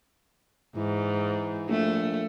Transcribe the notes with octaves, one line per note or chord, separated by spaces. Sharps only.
G#2 E3
A#1 A3